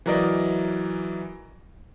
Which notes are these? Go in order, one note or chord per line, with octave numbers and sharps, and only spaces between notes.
E3 F#3 A#4 D5 D#5